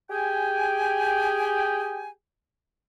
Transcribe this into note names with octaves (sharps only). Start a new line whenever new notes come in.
G4 G#4 G5 G#5